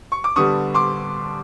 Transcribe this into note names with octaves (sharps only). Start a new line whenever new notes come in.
C#6
D6
D3 G3 B3 D4 C#6 D#6
C6 D6